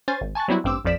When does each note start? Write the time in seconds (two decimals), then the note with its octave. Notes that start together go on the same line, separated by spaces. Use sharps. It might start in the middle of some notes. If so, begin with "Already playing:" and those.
0.08 C#4 C5 G#5 A6
0.21 G#1
0.35 G#5 A5 C#6 F#6 A6
0.48 F#3 G3 B3 C4 E4 F#4
0.64 A1 G2 C4 D6 E6
0.85 A1 F2 F3 D5 B6 E7